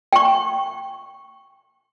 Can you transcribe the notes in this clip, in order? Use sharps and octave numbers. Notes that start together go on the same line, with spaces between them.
G5 C#6